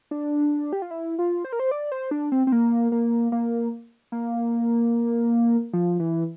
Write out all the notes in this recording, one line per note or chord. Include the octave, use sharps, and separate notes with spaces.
D4
G4
F4
E4
F4
C5
A#4
C5
D5
C5
D4
C4
C4
A#3
A#3
A#3
A#3
F3
E3